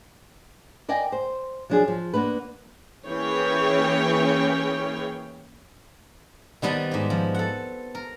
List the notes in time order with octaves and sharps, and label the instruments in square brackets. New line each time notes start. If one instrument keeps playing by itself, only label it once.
[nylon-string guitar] A#4 D5 D#5 G5 G#5
C5
F3 F#3 D4 F4 G#4
F3
A#3 B3 D4 B4
[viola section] E3 A#3 C#4 G#4 C#5 G5
[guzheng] D#3 G3 B3 C4 A5
G#2 G4
F3
A4 F#5
A#4